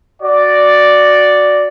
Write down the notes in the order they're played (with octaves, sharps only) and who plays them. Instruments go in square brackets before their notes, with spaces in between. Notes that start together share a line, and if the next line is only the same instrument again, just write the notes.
[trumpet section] F#4 D5